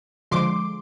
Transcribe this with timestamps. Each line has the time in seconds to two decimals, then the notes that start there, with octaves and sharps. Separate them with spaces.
0.31 D3 F3 G#3 C6 D6